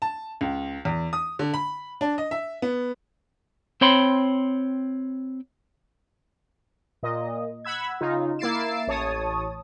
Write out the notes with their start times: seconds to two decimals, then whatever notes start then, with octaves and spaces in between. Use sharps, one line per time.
0.02 A5
0.41 C#2
0.85 E2
1.13 D#6
1.39 D3
1.54 B5
2.01 D4
2.18 D#5
2.31 E5
2.62 B3
3.81 C4 C5 C#5 G5 B5 C6
7.03 A#2 D#5
7.65 F#5 B5 E6 G#6
8.01 C#3 D#4 F4
8.39 A#3 E4 A6 C7 D7 E7
8.87 A1 C#5 A5 D#6